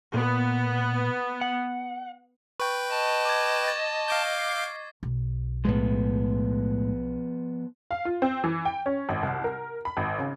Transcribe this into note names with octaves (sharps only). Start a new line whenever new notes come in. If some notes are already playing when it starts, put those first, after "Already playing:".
A#2 B3
F#5
B4 G5 C#6
D#5 A5
D6 G#6
A6
F5 D6 G6
C7
B1
A2 F3 G#3 B3
F5
F4
C4
E3
G5
C#4
G#1
C2
A#4
B5
G#1
C#3